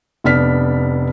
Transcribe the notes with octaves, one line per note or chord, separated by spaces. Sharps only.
F1 B3 D4 F6 B6